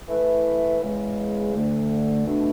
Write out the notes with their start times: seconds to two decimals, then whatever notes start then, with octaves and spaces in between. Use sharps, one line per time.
0.08 E3 A3 E4 B4
0.81 E2 C#3 E3 G#3
1.55 D2 D3 A3
2.27 B2 A3 D4